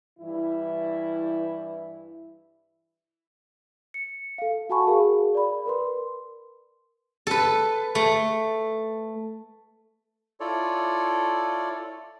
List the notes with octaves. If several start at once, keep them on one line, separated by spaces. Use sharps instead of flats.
G2 E3 E4
C#7
A4 F5
F#4 F#5 G#5 A5 B5 C#6
F#4 G#4 A#4 F5
D5 B5
A#4 B4 C6
A4 B4
A3
E4 F4 A4 C#5 D5